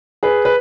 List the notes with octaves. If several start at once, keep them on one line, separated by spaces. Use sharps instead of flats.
G#4 B4
B4